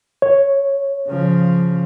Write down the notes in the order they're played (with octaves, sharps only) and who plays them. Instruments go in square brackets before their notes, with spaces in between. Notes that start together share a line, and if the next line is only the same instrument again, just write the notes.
[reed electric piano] C#5
[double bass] C#3 F3